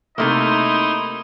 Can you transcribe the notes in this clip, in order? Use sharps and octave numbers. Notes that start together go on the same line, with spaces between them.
C3 A3 A#3 D#4 E4 D#5 C6